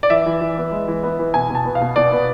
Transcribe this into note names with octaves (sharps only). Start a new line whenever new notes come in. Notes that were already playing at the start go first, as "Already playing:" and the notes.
D5
E3 E5
E3
E3
B3
G#3
E3
B3
E3
B2 G#5
B2 A5
B3
F5
B2
B2 D5
B3